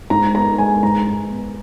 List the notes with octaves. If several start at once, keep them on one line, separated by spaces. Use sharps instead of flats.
G#2 A#5
B3 A#5
G#3 G#5
G#2 A#5
G#2
B3